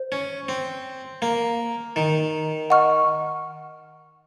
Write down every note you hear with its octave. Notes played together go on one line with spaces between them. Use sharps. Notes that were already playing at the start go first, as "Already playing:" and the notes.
Already playing: C5
C#4
C4
A#3
D#3
D#5 F#5 C#6 F6